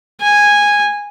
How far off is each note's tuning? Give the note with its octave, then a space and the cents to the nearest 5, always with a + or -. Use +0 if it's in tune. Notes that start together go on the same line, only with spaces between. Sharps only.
G#5 -10